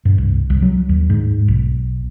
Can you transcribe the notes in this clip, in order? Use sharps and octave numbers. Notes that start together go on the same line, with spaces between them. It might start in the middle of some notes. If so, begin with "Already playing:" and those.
G2
C2
C2
F#3
D#2
G#2
B1